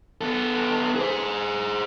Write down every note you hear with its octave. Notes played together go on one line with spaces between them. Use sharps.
B3 A4
G#4 C5